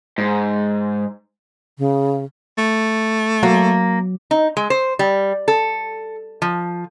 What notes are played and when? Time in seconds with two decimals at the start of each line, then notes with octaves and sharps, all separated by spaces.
0.18 G#2
1.78 C#3
2.58 A3
3.43 F#3 A#3
4.31 D#4
4.57 G#3
4.70 C5
4.99 G3
5.48 A4
6.42 F3